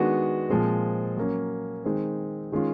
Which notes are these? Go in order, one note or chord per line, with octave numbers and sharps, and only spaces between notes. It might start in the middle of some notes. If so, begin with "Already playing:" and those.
Already playing: D#3 G#3 B3 D4 F#4
A#2 F3 G#3 C4
F#3 A#3 C#4
D#3 G#3 C4
D#3 G#3 C#4 F4